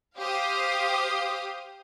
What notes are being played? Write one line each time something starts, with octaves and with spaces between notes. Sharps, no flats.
G4 C5 F5 G5 D#6